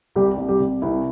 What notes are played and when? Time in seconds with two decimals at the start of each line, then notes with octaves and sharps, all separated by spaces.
0.16 C2 G3 G4
0.37 C2
0.49 G3 G4
0.60 C2
0.82 C2 E4